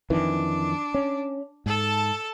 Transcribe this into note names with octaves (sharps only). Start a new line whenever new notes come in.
F2 D#3 E3 D4
C#4
G#2 A4 A5